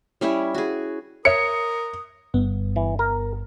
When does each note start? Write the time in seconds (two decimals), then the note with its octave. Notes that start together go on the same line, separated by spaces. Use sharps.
0.21 G3 C#4 E4 E5
0.54 F#4 G#4
1.25 A#4 C#5 E5 D#6 C#7
2.34 G1 G2 B3
2.76 E3
2.99 A#4